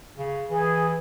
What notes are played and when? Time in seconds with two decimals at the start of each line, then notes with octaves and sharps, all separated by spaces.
0.18 C#3
0.50 E3 G#4